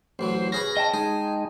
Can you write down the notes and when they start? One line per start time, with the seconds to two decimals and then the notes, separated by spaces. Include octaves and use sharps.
0.19 A1 E3 F#3 C5
0.52 C#4 G#4 B4 A#6
0.77 D#5 G5 A5
0.94 G#3 D#4 G#4